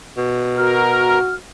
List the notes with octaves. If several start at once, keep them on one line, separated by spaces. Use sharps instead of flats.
B2
F#4 A#4 F6